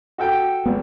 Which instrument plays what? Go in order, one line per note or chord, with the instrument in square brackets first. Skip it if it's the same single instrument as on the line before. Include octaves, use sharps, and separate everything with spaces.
[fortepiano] F#4 A4 G5
[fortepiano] G#1 [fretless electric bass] B3